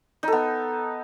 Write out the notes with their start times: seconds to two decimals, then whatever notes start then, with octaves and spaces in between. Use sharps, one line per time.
0.23 D#4
0.28 A4
0.32 B3